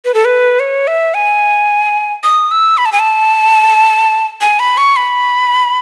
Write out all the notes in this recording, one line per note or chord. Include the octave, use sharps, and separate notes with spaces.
B4
A4
B4
C#5
E5
G#5
D#6
E6
B5
A5
G#5
A5
G#5
B5
C#6
B5